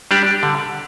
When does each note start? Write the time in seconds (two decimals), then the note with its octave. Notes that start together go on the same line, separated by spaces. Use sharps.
0.11 G3 D4 G4 D5
0.43 D3